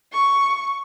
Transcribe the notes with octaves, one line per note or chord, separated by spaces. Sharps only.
C#6